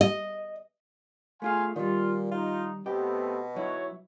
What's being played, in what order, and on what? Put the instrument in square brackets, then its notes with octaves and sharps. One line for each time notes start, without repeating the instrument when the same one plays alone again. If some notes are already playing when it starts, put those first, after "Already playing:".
[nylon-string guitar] D#5
[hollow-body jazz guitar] A3 F4 G#4 [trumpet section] F5 G#5 C6
[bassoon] A#2 [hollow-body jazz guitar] D#3 G3 [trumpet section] F4
[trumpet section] D#4 [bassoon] F4
[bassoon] B2 [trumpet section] A3 B3 C4 [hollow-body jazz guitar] G4
[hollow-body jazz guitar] F#3 D#4 E4 [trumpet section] F#4 C#5